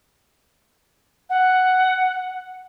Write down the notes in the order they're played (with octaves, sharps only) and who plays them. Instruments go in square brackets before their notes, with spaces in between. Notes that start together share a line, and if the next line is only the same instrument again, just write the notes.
[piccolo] F#5